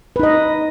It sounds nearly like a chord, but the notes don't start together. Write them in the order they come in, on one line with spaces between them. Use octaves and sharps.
B4 D#4 D#5